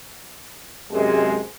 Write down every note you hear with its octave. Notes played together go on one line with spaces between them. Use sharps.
F#2 C3 G#3